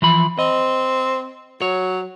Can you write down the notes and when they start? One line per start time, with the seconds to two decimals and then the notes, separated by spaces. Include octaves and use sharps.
0.02 E3 F3 B5
0.39 C4 D#5
1.62 F#3 C#5